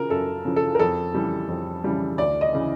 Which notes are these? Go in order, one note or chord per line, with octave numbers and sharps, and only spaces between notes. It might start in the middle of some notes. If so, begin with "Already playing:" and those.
Already playing: C#3 F3 A#4
F#2 A4
C#3 F3
A4
A#4
F2 A4
C#3 E3 G3
F2
C#3 E3 G3
D2 D5
D#5
C#3 E3